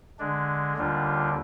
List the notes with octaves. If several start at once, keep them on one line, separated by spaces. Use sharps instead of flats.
D3 G#3 D4
D#2 D3 G3 D4 F4